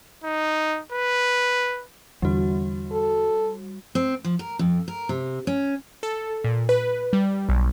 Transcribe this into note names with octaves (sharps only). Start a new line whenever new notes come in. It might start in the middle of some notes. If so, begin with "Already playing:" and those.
D#4
B4
E2 D3 G3 F#4
A4
C4
F3
A#4
F2
A#4
C3
C#4
A4
A#2
B4
G3
B1